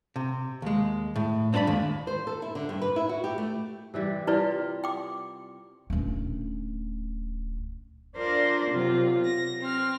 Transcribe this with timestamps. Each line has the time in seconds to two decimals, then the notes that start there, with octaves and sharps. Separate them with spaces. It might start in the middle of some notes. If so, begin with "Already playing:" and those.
0.16 C3
0.62 D#2 G#3
1.16 A2
1.53 G2 C4 D4 B4 D5 B5
1.67 D#2 G#3
2.07 C5
2.27 A4
2.42 E4
2.55 D3
2.69 G2
2.82 B4
2.96 E4
3.09 F#4
3.24 G4
3.38 A3
3.94 C3 E3 G3
4.27 G3 E4 F4 A#4 B4 D5
4.84 G5 D6
5.90 D1 C#4
8.16 D4 F4 A#4 C5 D5
8.69 C3 F#3 F4
9.24 A#6
9.60 C4 F6